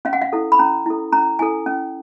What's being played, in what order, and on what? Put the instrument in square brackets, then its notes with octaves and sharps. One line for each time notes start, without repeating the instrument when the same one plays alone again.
[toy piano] C#4 F5
F#5
F5
E4 A4
B5
C#4 A#5
E4 A4
C#4 A#5
E4 A4 G#5
C#4